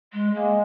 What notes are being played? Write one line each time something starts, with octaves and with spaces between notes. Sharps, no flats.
G#3
G#3 A#3